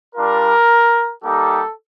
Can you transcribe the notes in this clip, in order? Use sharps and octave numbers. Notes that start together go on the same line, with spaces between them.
G3 D4 F4 A#4
G3 A#3 D#4 G4 A4